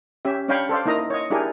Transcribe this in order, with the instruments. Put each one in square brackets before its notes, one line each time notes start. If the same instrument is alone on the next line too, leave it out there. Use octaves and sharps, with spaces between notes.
[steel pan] C#4 G4 E5
C#4 D4 C#5 F5 G5 B5
A4 C5 D5 F5
A#3 D#4 E4 D#5 A#5
C#5 D#5
D4 E4 G4 G#4 A#4 G#5